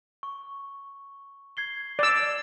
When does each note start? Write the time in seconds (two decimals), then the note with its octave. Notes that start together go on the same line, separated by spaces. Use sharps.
0.23 C#6
1.57 G#6 C7 G7
1.99 D5 E6